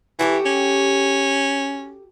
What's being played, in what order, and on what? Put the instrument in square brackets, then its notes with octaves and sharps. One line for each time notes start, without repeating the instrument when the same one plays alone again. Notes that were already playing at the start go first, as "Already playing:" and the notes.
[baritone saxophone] E3 [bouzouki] F#4 G4 A4
[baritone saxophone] C#4